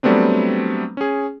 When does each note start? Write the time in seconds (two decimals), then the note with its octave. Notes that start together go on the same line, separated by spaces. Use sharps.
0.03 F#3 G3 A3 B3 C4 D4
0.97 C#4 G#4